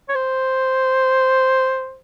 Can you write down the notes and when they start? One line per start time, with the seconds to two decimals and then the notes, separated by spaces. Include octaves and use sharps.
0.09 C#5
0.15 C5